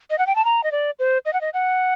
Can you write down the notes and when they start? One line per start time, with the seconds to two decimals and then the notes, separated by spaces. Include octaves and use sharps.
0.10 D#5
0.18 F#5
0.27 G5
0.35 A5
0.45 A#5
0.63 D#5
0.72 D5
0.99 C5
1.25 D#5
1.33 F#5
1.41 D#5
1.54 F#5